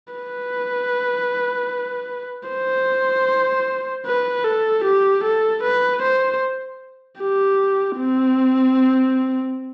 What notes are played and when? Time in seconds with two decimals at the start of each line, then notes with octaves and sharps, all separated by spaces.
0.14 B4
2.49 C5
4.06 B4
4.45 A4
4.84 G4
5.24 A4
5.63 B4
6.02 C5
7.20 G4
7.97 C4